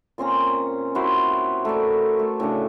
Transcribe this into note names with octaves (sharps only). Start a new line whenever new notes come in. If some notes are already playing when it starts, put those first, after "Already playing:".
A#2 C4 C#4 A#5
E4 F#4 C5
A3 A#4 D5
A3
A2 C#3 D4